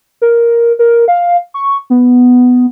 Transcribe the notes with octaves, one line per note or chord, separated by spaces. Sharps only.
A#4
A#4
F5
C#6
B3